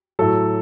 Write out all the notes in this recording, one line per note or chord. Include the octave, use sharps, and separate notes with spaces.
A2 F#3 A4